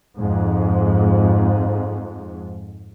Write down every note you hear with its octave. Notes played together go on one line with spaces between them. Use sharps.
F2 G#2